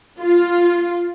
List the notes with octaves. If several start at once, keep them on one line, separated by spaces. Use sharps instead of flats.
F4